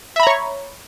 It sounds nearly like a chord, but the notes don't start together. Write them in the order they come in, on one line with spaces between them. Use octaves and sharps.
E5 B5 A#5 C#5 C#6